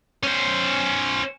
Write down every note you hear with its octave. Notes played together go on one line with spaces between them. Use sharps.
C#4 C5